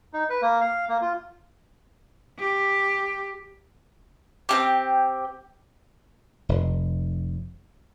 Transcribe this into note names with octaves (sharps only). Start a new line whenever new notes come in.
D#4
B4
A#3
F5
A#3
F4
G4
C4 C#4 G4
F1